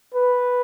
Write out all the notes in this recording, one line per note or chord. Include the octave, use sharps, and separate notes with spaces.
B4